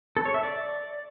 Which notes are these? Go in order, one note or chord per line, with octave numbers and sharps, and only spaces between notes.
A4
C#5
E5
D5